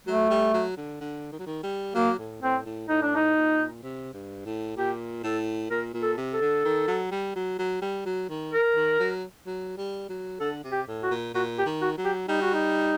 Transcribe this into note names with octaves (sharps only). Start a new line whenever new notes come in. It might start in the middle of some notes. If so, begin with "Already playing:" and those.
F#3 A3
G3
F#3
D3
D3
D#3
F#3
D#3
G3
F#3 A#3
A2
A2 C4
A2
A2 D#4
D4
D#4
A#2
C3
G2
A2
A#2 G4
A2 A4
A#2 A#4
A#2
A4
C3
A4
D3
D#3
F#3
G3
F#3
F#3
G3
F#3
D#3
A#4
D#3
F#3
F#3
G3
F#3
D3 A4
C3
G4
A2
F#4
A#2
A#2 F#4
G4
D#3
F#4
F#3
G4
G3 D#4
F#4
D#4